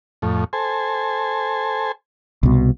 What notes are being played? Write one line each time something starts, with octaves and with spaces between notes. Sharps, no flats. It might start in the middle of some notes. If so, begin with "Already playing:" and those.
F2 A2
A4 C5 G#5
C2 B2